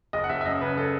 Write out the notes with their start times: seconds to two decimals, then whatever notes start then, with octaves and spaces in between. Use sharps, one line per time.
0.13 F#1 D#5
0.24 F#5
0.29 F#1 E5
0.41 E5
0.46 F#2 D#5
0.61 C#3 B4
0.77 C#3 A4